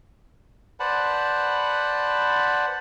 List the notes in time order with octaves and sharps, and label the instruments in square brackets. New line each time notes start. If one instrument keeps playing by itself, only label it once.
[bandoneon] B4 C5 D5 F#5 A5 B5